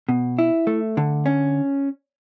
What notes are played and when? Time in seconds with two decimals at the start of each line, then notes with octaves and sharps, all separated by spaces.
0.09 B2
0.38 E4
0.67 A3
0.97 D3
1.26 C#4